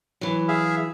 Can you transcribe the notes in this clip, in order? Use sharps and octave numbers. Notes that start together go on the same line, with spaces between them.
E3 F#3
G#4 E5 F5